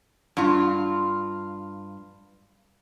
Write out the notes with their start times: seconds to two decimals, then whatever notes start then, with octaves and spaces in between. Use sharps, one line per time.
0.37 G2 F4